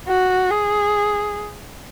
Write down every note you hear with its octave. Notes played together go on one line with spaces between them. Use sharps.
F#4
G#4